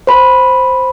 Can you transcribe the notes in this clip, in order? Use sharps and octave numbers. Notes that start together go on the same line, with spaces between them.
C5 B5